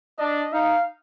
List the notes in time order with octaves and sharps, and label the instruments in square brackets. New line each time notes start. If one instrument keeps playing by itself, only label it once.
[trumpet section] D4 [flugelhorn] D#5
[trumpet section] D#4 [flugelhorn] F5